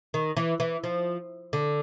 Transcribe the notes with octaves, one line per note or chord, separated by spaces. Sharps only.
D#3
E3
E3
F3
D3